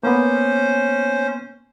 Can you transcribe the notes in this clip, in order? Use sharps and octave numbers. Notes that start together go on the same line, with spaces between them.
A#3 B3 C#4 C5